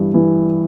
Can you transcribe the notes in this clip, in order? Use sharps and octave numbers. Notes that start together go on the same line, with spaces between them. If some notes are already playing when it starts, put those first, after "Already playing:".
Already playing: G2 E3
E3